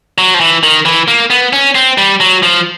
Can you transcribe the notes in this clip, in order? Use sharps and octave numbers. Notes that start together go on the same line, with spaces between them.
F#3
F3
E3
D#3
E3
A#3
B3
C#4
C4
G3
F#3
F3